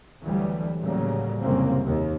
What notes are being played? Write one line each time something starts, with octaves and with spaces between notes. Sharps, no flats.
D2 E3 F#3 G3
D2 A2 C#3 F#3 G3 A#3
C2 F2 G#2 C#3 A#3 C4
D#2